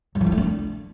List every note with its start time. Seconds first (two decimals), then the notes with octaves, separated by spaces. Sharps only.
0.15 F#3
0.21 F3
0.26 E4
0.32 A3
0.38 D4